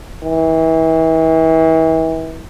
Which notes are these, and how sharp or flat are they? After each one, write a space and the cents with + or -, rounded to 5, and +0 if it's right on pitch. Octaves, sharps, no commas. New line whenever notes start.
E3 -35